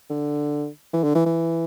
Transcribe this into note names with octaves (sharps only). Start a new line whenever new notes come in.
D3
E3
D3
E3
E3